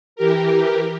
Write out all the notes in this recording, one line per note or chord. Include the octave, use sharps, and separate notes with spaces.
E3 G4 A#4